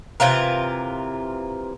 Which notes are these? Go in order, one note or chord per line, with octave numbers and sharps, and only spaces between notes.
C3 E3 F4 A#4